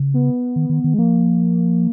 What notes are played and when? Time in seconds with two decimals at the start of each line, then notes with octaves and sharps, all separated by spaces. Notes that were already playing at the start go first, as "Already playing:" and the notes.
Already playing: C#3
0.14 B3
0.56 D#3
0.70 D#3
0.84 D#3
0.94 G#3
0.98 F3 A#3